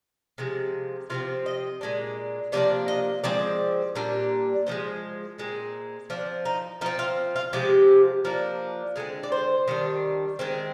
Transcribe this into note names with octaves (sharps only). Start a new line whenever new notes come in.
C3 F3 G#3
C3 F3 C4 F4
D#5
A#2 G#3 D4
C3 F3 A#3 D4 D5
D#5
F3 G#3 C4 D5
A#2 G3 D4
D3 F3 G#3 C5
A#2 G#3 C4
F3 C4 D4
D#4
F3 C4 D#4
F4
F4
C3 F3 G#3 G4
F3 A#3 D4
D3 G#3 C4 G#4
D5
C5
D#3 G3 D4
D#3 G#3 C4